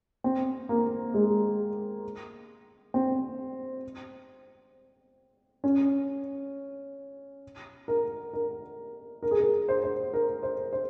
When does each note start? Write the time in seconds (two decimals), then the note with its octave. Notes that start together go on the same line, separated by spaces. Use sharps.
0.24 C4
0.69 A#3
1.14 G#3
2.94 C4
5.64 C#4
7.88 A#4
8.33 A#4
9.23 A#4
9.31 G#4
9.40 A#4
9.68 C5
9.83 C5
10.14 A#4
10.43 C5
10.73 C5